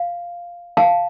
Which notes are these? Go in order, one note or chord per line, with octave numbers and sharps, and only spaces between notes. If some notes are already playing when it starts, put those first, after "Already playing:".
Already playing: F5
F5 A5